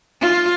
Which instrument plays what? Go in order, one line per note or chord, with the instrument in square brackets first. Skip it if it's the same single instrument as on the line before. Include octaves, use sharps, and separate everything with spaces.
[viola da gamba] F4